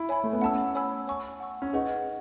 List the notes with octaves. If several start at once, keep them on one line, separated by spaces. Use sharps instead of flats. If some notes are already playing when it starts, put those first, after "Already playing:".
Already playing: E4
C#5 G#5 B5
A3
B3
C#4 F#5 A5 E6
C#5 G#5 B5 E6
C#5 G#5 C#6 E6
F#5 C#6 E6
C#4
D#4 G#4 B4 F#5 C#6